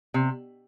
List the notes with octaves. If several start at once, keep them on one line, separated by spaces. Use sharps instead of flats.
C3